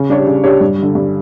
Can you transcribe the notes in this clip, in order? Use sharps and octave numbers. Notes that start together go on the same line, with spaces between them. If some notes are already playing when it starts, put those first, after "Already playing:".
Already playing: C#3
G3 D4 G4 C#5
C#3
G3 D4 G4 C#5
G2
D3 G3
G2